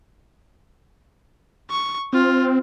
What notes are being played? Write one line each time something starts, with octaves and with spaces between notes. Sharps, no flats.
C#6
C4 F4